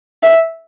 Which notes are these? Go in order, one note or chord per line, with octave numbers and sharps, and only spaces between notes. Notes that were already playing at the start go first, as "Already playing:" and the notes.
E5